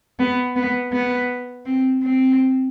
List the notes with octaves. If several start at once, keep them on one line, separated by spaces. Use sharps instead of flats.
B3
B3
B3
C4
C4